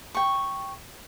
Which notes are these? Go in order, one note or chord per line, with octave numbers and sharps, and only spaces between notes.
G5 C#6